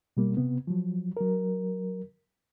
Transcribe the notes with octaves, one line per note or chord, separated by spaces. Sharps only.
B2 G3 A#3
C3 B3
F3 F#3
F#3 A#4